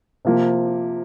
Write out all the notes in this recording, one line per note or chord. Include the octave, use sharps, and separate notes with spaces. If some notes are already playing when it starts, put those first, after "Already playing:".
C3 F3 A#3